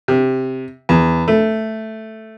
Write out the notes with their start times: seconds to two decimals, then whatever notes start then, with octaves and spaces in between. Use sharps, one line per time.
0.08 C3
0.89 E2
1.28 A3